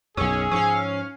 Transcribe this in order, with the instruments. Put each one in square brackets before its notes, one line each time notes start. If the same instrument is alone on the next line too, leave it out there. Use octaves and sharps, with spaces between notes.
[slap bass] B1 F#2 [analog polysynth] C#4 [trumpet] G#4 [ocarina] E6
[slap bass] G#2 F3 [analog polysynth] C#4 F5